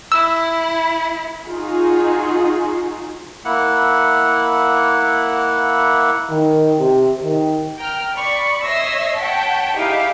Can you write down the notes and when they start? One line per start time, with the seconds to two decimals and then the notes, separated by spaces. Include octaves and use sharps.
0.12 E4 E6
1.46 D#4 F4 F#4 G#4
3.45 A#3 E4 F#5
6.30 D#3
6.79 C3
7.24 D#3
7.77 G5 A#5 F6
8.16 D5 B5 C#6
8.65 C#5 D#5 E5 E6 A#6 C7
9.18 C#5 F#5 G5 A5 B6
9.76 D#4 E4 G4 G#4 E5 F5